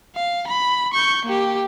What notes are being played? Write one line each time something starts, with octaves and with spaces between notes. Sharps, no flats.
F5
B5
C#6 G6
A#3 G4